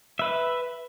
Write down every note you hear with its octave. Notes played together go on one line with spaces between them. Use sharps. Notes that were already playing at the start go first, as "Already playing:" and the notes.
B4 E5